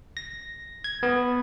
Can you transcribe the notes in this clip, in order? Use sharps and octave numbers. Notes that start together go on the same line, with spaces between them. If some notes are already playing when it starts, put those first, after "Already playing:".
A#6
G#6
B3